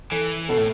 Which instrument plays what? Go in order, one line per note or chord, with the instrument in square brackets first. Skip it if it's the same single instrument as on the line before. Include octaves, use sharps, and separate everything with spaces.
[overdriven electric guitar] E3 [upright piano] A4
[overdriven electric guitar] B2 [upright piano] A4
[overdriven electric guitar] A2